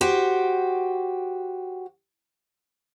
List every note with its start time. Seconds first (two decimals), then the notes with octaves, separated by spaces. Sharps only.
0.01 F#4 G4 C5